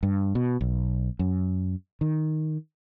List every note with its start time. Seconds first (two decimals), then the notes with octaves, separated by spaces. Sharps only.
0.03 G2
0.35 B2
0.61 B1
1.19 F#2
2.01 D#3